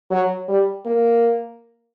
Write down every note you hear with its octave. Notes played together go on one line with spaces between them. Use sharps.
F#3
G3
A#3